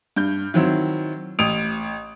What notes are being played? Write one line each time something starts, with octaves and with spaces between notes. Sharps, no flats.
G2 G6
D#3 F#3 C4 E4
A1 D#6 D7 F7